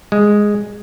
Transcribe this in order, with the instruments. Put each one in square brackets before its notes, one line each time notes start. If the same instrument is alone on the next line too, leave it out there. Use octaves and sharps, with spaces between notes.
[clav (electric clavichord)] G#3